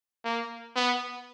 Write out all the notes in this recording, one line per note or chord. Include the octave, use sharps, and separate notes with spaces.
A#3
B3